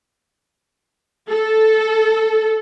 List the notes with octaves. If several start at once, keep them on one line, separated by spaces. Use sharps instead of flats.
A4